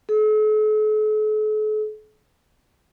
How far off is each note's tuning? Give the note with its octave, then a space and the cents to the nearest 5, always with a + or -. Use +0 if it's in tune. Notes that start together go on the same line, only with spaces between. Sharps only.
A4 -45